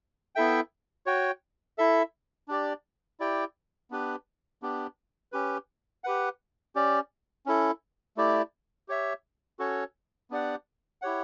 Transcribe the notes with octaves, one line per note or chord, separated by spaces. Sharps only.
B3 E4 A4 E5 G5
F#4 C#5 G5
E4 A4 E5
D4 G4 D5
E4 G4 D5 G5
B3 D4 G4 B4
B3 D4 G4
C#4 G4 B4
G4 B4 F#5
C#4 G4 D5
C#4 E4 A4
A3 E4 G4 D5
G4 C#5 E5
C#4 F#4 A4 C#5
B3 D4 G4 D5 F#5
E4 G4 C#5 F#5